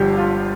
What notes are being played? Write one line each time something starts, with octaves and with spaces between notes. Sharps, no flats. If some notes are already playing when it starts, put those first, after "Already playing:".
Already playing: G1 G2 D3 F3 G4
F4